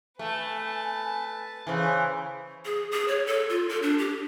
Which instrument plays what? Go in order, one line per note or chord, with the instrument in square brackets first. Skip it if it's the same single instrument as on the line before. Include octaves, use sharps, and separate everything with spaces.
[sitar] A3 [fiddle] B4 A5 [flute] G#5
[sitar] C#3 E3 [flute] C5
[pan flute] G#4
G#4
C#5
A4
F4
A4
D4
G4